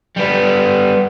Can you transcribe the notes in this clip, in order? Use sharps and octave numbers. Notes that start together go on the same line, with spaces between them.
G3 B3